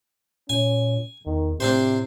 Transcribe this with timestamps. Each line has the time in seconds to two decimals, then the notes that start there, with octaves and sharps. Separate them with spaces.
0.49 A#2 C#4 G#5
1.26 E2 D#3
1.60 A2 C3 C4 D4 C5